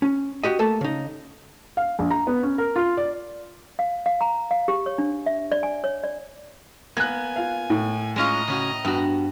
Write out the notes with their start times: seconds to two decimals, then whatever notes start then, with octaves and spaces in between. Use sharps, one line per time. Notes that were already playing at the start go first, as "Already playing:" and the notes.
0.02 C#4
0.43 F#4 G4 D#5
0.59 A3 A#3 A4 A5
0.81 C#3 D#4
1.77 F5
1.99 A#1
2.10 A#5
2.27 B3
2.43 C#4
2.58 A#4
2.76 F4
2.97 D5
3.79 F5
4.06 F5
4.21 A#5
4.51 F5
4.68 G4
4.86 C#5
4.98 D4
5.26 E5
5.52 D5
5.63 G#5
5.84 C#5
6.04 D5
6.97 A#3 B3 G#5 F#6 G#6
7.36 F4 F5
7.70 A2
8.16 G#3 C#4 F4 D#5 A#5
8.48 C#3 C#4 F#4
8.85 G2 B3 F#4